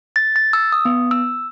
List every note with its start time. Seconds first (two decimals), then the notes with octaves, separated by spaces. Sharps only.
0.16 A6
0.36 A6
0.53 E6
0.72 D#6
0.85 B3
1.11 E6